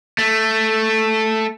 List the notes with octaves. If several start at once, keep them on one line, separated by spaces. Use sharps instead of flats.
A3